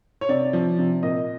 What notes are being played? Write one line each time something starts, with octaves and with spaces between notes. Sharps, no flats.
C#5
C3 D5
F3
C3
A#2 D#5